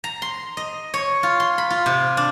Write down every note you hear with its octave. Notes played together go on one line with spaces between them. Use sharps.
A#5
C6
D#5
C#5
F4
C6
B5
F4
C3
D4